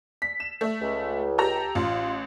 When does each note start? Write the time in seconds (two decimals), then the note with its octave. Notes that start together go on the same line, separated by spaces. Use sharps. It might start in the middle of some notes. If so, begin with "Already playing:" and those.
0.22 B6
0.40 E7
0.61 A3 E5
0.81 C#2
1.38 G4 A4 A#5
1.75 A1 F4